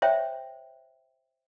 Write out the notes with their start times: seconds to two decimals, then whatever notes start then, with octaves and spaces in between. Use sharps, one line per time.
0.02 C5 C#5 E5 G5